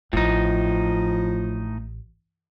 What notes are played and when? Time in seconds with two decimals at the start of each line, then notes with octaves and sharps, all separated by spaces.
0.13 A1 A2 F3 D#4